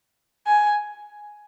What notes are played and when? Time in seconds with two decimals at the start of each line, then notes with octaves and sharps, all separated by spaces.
0.47 G#5